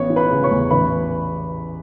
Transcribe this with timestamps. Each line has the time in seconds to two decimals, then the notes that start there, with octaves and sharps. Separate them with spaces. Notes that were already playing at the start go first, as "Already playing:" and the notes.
Already playing: A1 B3 C#5 C#6
0.10 E3
0.16 B4 B5
0.30 C#3
0.44 C#5 C#6
0.51 E2
0.70 A1 B4 B5